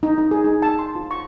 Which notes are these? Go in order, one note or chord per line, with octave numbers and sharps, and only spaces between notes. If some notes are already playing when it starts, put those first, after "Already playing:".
D#4
D#4
G#4
D#4
A5
C6
F4
C#6